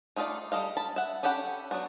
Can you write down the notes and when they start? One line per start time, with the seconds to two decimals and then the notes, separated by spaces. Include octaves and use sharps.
0.16 A3 D#4 F4 A#4 D5
0.52 G3 A4 D#5 F5
0.77 A5 B5
0.96 E5 F#5
1.23 C#4 G4 A4 F#5 B5
1.71 F#3 B3 D4 F#4